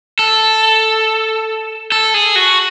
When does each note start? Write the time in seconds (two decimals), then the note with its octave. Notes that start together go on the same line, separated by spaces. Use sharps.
0.19 A4
1.92 A4
2.14 G#4
2.36 F#4